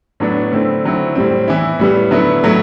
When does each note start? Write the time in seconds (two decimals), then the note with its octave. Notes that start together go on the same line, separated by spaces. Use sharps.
0.20 A2 F#3 B3 D4
0.52 D3 A3 C4 E4
0.84 D3 F#3 C4 E4
1.15 A2 G3 C4
1.48 E3 B3 E4
1.79 A2 G3 B3
2.11 D3 F#3 B3 E4
2.43 A2 F#3 A3 E4